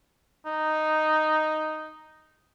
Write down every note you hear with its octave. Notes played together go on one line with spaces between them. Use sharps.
D#4